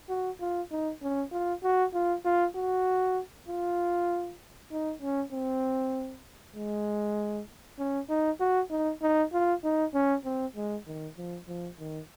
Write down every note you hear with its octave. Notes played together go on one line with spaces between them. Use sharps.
F#4
F4
D#4
C#4
F4
F#4
F4
F4
F#4
F4
D#4
C#4
C4
G#3
C#4
D#4
F#4
D#4
D#4
F4
D#4
C#4
C4
G#3
D#3
F3
F3
D#3